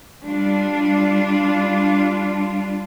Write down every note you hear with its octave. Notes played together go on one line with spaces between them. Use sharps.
G3 D4 F4